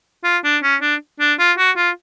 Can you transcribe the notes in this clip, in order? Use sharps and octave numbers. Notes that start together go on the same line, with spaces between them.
F4
D4
C#4
D4
D4
F4
F#4
F4